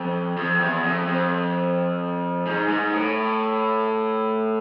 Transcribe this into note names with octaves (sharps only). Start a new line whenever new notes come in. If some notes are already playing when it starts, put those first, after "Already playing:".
Already playing: F2
F2
E2
F2
F2
G#2
G#2
A2